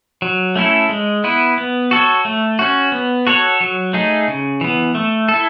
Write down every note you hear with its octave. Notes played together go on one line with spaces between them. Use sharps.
F#3
A3 C#4 E4 A4
G#3
B3 E4 B4
B3
F#4 A4 C#5
A3
C#4 F#4
B3
F#4 A4 C#5
F#3
A3 D#4 G#4
C#3
E3 B3
A3
A4
E4